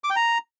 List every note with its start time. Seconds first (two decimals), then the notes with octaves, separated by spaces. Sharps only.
0.04 D6
0.10 G5
0.16 A#5